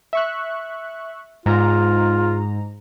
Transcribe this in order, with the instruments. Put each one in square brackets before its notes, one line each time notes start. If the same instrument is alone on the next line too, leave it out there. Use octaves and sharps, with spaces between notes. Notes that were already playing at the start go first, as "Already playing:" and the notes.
[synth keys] E5 C#6 F#6
[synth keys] G#2 A#5 [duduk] F4